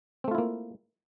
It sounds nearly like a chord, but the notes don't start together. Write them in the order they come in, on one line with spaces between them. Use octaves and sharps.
C4 A3 F4 E4 A#3